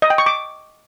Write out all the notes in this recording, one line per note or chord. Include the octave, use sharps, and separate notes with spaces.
D#5
G5
C#6
D6